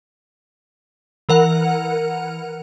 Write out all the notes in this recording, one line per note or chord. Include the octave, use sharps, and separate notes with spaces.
E3 A#4 F#5